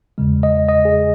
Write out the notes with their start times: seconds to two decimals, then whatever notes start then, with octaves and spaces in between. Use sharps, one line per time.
0.18 E2 C#3 G#3
0.43 D#5
0.69 D#5
0.85 G#4